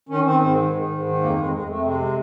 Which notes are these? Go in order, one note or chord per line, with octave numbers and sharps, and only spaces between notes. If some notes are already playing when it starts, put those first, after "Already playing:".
D#3 C#4
D#3 C4
G#2 C4
D#3
D#3
G#2
D#3
F2 A#3
F2 G#3
F2 G#3
F2 A3
C3 G#3
G#3